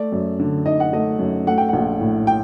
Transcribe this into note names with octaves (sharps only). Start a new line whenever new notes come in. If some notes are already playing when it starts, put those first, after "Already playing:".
Already playing: A3 D5
F#2
D3
D#4 D#5
F#5
A3 D#5
F#2
A3 F#5
G5
A#1 F#5
A2
G5